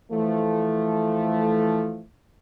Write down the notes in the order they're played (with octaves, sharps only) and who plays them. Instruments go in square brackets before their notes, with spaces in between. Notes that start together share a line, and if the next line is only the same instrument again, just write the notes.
[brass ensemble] E3 F3 A3